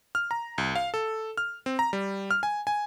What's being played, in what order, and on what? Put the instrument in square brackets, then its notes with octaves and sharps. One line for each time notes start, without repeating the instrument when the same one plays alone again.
[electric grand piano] F6
A#5
C2
F5
A4
F6
C4
A#5
G3
F6
G#5
G#5